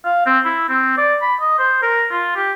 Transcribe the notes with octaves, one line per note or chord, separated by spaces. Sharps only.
F5
C4
E4
C4
D5
B5
D#5
C5
A#4
F4
G4